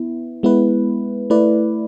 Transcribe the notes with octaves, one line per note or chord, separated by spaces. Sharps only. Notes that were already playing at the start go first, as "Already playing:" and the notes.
Already playing: B3 E4
G#3 B3 E4 B4
A3 E4 B4 D5